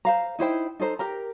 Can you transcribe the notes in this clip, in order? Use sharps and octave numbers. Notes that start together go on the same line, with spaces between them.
C5 F5 A#5
D#4 E4 C5 G5
D#4 A4 C5 A#5
G4 A#4 A#5